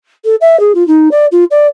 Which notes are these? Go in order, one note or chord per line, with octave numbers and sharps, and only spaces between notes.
A4
E5
G#4
F4
D#4
D5
F4
D5